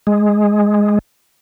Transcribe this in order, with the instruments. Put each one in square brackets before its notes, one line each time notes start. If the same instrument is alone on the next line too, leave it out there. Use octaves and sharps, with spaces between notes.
[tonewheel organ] G#3